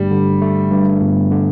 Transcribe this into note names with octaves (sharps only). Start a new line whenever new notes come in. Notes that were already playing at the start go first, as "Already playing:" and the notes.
Already playing: G1 G2 G3 A3
D3
A3
G2
G1
D3